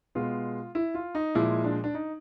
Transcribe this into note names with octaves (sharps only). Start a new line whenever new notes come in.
B2 G#3 B3 F4
E4
F4
D#4
A#2 F3 G#3 E4
D4
D4
D#4